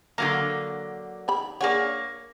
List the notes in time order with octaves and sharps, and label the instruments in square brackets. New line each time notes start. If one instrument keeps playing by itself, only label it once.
[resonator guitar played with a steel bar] D3 F#3 A#3 [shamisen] A#5
[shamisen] D#3 G4 B5
[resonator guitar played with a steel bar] A#3 C#5 [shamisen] D4 G#4 F#5